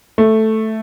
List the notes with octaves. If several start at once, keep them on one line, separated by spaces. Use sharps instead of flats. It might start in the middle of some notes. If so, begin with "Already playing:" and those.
A3